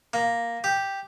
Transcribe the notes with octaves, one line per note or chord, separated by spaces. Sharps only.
A#3
G4